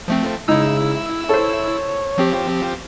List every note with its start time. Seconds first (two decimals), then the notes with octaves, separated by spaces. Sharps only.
0.08 F3 A3 C4
0.48 C#3 G#3 D#4 E4 E6
1.29 A4 C5 C#5
2.18 F3 C4 G4